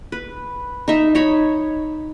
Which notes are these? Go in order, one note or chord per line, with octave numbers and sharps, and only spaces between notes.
B4
D#4 E5
D#4 C#5 B5